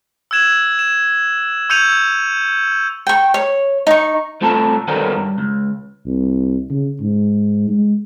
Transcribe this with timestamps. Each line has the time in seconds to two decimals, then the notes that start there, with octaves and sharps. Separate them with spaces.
0.31 E6 F#6 G#6 E7 F#7
0.79 E7
1.69 C#6 E6 G6 C#7 D#7 F7
3.07 G5 C#6
3.34 C#5
3.87 D#4 C#6
4.41 C2 A3 F4 A4 A5 A#5
4.88 D#3 F#3 G3 B3 A4 A#4
5.16 G2
5.38 C#2
6.06 C2
6.70 C#3
7.01 G#2
7.69 G#3